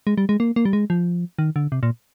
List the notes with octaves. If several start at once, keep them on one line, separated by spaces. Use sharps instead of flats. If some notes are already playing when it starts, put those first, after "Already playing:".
G#3
G3
G#3
A#3
A#3
G3
G#3
F3
D#3
D3
C3
A#2